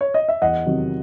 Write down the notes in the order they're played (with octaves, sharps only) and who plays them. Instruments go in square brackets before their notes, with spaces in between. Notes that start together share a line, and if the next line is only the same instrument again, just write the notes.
[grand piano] C#5
D#5
E5
E2 D#5 F#5
C3 D#3 F#3